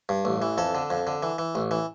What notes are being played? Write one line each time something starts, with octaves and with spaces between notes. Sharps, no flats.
G2
A1
E3
F2 A4
D3
F2
D3
E3
E3
A1
E3